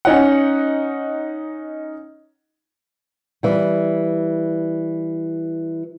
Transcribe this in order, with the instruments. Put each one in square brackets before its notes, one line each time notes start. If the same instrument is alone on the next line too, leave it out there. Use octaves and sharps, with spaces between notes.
[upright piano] C#4 D#4 F#5
[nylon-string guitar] E3 G3